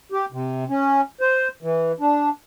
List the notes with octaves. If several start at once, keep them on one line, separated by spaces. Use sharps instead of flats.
G4
C3
C#4
C5
E3
D4